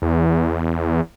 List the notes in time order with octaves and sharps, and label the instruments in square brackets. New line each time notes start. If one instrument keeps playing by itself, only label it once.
[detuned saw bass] E2